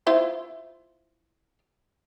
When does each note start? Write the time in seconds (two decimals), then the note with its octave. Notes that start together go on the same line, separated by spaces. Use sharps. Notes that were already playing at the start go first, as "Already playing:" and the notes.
0.07 E4 F4 C5